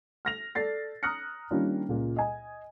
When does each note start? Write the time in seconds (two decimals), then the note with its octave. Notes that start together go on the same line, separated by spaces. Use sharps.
0.25 F6 A#6 F7
0.55 A4 D5 A6 C7
1.03 A#5 D#6 F6 F#6 A#6 C#7
1.51 D#3 G3 A#3 C#4 D4 F4
1.89 C#2 A#2
2.16 D#5 G#5